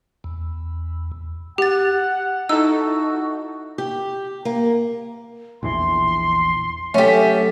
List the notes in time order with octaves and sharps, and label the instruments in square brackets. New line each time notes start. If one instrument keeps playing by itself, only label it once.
[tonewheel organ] E2
[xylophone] G4 A6 [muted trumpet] F#5
[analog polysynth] D#4 E4 A4 [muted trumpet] F#4 [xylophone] E6
[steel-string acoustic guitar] G4
A#3
[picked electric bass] A#1 E2 E3 [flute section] C6
[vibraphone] F#3 A4 [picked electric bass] A3 [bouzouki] C#4 G4 [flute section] E5